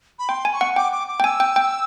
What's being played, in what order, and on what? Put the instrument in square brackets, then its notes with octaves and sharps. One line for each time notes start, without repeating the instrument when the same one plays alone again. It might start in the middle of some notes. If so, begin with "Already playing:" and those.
[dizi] B5
[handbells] G5 [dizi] C6
[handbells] G#5
[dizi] C#6
[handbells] F#5
[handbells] G5 [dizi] D6
[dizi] D6
D6
[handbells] G5
[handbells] G#5 [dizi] E6
[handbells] G5
G5